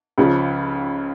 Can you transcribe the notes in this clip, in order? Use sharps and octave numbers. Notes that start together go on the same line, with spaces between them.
C#2 C#3 F3